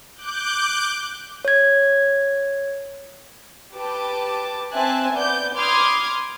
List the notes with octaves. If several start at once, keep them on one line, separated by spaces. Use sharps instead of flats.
D6 F#6 G6
C#5 G#6
G4 B4 A5 D6
C4 E5 G#5 A5 F#6
B3 D5 D6 G6
B5 C6 D6 D#6 F6 G#6